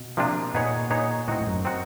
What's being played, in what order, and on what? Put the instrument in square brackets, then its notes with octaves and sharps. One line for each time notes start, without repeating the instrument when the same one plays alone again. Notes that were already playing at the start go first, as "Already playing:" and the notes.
Already playing: [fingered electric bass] B2
[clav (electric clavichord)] C3 F3 A#3 D4 F4
[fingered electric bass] A#2 [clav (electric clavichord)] B3 D#4 G#4 C#5
[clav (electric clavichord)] B3 D#4 G#4 C#5
[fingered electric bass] A2 [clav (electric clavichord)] C4 D#4 F#4
[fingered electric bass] F2
F#2
[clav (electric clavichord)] C4 D#4 F#4